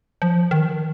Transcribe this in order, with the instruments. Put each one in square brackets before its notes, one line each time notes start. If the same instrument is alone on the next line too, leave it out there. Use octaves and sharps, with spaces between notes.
[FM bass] F3
D#3